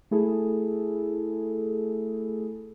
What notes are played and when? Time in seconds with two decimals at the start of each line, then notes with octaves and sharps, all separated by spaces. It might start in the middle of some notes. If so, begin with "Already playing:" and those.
0.11 A3 E4 G#4 A4